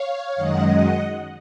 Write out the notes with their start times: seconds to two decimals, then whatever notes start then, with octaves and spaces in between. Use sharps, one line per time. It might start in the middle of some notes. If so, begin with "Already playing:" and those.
Already playing: C#5 F5
0.36 F#2 D#3 G#3 D#5 F#5
0.67 D#5 F#5